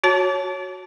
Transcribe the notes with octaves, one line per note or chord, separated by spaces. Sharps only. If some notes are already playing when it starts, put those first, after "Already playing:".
F#4 C#5 A5